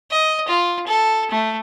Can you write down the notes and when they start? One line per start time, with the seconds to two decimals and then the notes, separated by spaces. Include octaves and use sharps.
0.11 D#5
0.48 F4
0.87 A4
1.31 A3